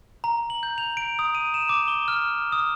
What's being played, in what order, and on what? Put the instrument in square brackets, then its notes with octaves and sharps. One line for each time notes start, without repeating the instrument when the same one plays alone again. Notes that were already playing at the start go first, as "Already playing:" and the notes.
[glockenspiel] A#5
F#7
G6
F7
D7
D#6
D#7
E7
D6
G7
F6
D#6